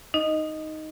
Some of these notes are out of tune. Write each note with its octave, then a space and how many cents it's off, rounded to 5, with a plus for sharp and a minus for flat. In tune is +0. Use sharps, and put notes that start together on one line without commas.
D#4 +5 D#5 +0